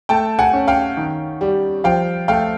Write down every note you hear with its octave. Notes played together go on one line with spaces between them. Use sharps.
A3 G5 A5
F#5 G#5
C#4
F5 G5
D#3
G3
F3 F5 G5
A3 F5 G5